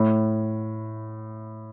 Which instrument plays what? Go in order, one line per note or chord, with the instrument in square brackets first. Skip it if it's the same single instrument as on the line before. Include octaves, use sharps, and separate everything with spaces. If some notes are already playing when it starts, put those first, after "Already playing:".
Already playing: [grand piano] A2